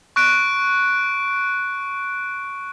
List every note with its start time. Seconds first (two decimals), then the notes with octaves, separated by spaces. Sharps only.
0.16 C#6 F#6 D7